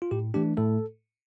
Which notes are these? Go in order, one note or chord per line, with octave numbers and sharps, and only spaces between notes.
F4
A2 G4
E3 A3 D4 G4
A2 A3 A4